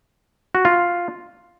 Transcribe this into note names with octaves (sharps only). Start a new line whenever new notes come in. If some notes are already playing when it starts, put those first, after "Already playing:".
F#4
F4